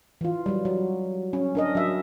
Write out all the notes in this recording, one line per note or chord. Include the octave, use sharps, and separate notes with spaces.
E3 F4
F#3 G3
F#3
C#4
D4 A#4 D#5
F#3 E5